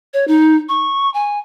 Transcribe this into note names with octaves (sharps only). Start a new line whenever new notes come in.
C#5
D#4
C#6
G#5